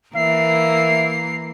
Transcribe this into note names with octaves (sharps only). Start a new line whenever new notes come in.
E3 A#3 A#4 E5 C7